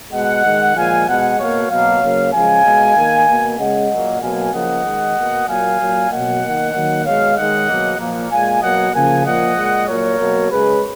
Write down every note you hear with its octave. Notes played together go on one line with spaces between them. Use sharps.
B2 G#3 D#5 F#5
D#3 G#3
A#2 F3 G#3 F5 G#5
B2 G#3 D#5 F#5
B2 A#3 C#5 F5
B2 F#3 A#3 C#5 F5
C#3 F#3 A#3
C#3 F3 G#3 F5 G#5
B2 G#3
D#3 A#3
B2 A#3
C#3 G#3 D#5 F#5
A#2 F#3 A#3
B2 F#3 A#3 F5 G#5
C#3 F3 A#3 D#5 F#5
D#3 G#3
B2 A#3
A#2 F#3 A#3 F5 G#5
A#2 F#3 A#3
B2 F#3 A#3 D#5 F#5
D#3 A#3
D#3 F#3 A#3
B2 G#3 C#5 F5
D#3 G#3 D#5 F#5
B2 F#3 A#3
A#2 F3 A#3
A#2 G#3 F5 G#5
B2 F#3 A#3 D#5 F#5
C#3 F3 A#3 F5 G#5
A#2 F3 A#3 D#5 F#5
A#2 G#3
A#2 F#3 A#3 A#4 C#5
B2 F#3 A#3
C#3 G#3 G#4 B4